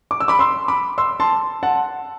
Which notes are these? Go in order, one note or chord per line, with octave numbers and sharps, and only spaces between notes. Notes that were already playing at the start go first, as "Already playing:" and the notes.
D6
E6
B5 D6
C6 E6
B5 D6
C6 E6
A5 C6
F#5 A5